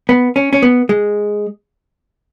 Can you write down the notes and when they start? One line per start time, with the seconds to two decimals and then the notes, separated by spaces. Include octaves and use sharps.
0.09 B3
0.36 C#4
0.53 C#4
0.62 B3
0.89 G#3